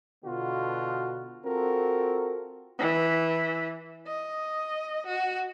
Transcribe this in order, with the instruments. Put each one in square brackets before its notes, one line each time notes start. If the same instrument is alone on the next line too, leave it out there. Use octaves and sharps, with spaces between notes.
[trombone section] B2 D3 B3 F4 F#4
C4 F4 F#4 A4 A#4
[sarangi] E3
D#5
F#4